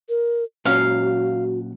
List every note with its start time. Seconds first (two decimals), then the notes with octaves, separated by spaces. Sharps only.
0.09 A#4
0.65 A#2 F#3 C#4 F#4 F5